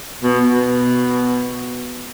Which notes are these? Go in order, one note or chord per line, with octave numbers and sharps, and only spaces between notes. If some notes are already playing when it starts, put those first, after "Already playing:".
B2
B2